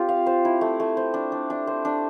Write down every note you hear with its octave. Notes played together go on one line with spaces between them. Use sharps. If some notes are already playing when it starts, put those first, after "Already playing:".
Already playing: C4 F4 G4
F5
C5
E4
A3
A3
C5
D4
D4
D4
C5
D4